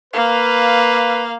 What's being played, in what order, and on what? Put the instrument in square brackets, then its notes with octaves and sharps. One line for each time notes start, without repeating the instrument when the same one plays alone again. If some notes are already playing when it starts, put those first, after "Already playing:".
[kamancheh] A#3 F5 [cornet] B4